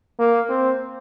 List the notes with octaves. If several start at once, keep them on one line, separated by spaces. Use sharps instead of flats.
A#3
C4